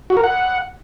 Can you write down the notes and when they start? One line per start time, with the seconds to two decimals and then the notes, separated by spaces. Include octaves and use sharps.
0.10 F#4
0.17 A#4
0.24 F#5